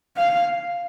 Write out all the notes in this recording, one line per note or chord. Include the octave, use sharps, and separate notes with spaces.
F5